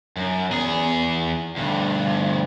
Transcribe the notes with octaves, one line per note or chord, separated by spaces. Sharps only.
F#2
E2 G#4
D2 G2